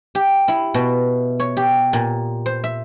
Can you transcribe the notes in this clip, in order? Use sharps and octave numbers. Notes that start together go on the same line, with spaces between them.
G4
E4
B2
C#5
G4
A#2
C5
E5